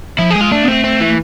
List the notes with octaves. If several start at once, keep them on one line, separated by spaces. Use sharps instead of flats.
F3 E4
G#3 G#4
F4
A3 D4
B3
A3 C4
C4
E3